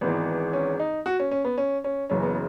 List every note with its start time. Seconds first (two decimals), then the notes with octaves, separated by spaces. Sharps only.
0.01 G#1 G#2 E3 B3
0.53 C#4
0.79 D#4
1.06 F#4
1.19 C#4
1.31 C#4
1.44 B3
1.58 C#4
1.84 C#4
2.09 F#1 F#2 C#3 E3 C#4
2.22 B3